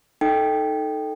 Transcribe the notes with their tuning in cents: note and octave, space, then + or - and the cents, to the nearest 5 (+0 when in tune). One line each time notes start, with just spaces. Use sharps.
D#4 +0 A4 +0 G5 +0